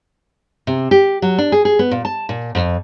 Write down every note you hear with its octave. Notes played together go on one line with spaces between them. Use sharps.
C3
G4
F#3
D4
G#4
G#4
B3
A#2
A5
A#2
F2